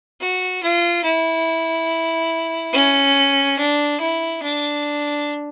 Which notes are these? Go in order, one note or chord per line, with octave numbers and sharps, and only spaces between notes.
F#4
F4
E4
C#4
D4
E4
D4